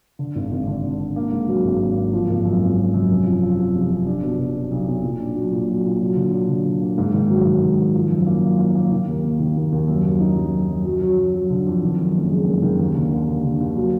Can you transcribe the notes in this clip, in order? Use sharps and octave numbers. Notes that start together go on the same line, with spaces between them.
D3
G#1
G#1
D3
G#1
D3
A#3
G#2
F#3
G#1
A#3
A#3
F3
G#1
F#2
G#1
F3
F#2
F1
F3
F3
F3
F1
F1
D4
B2
B2
B2
B1
B1
A#2
D4
F#3
A#2
F#3
A#2
F#3
D3
F#3
D3
D3
A#3
G#2
D#3
F#3
G#2
G#2
D#3
F3
F#2
A#3
F#2
A#3
A#3
D#3
D#2
A#3
D#3
D#2
D#2
F#2
F#2
D#4
F#2
F#2
F#2
F#3
F#3
F#3
F#3
D3
F2
D#3
F#2
F#1
G#3
F#1
D#3
D#2
D3
D#2
D3
D3
D#2
F#3